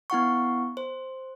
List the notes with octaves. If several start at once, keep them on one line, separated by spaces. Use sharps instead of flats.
B3 E4 F#5 C#6
C5